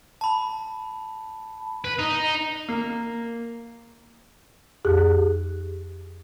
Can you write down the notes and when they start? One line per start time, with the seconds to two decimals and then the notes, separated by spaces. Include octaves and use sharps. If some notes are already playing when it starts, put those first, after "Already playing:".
0.21 A5 B5
1.85 B4
1.99 D#4
2.69 A#3
4.85 F2 G4 G#4 F#6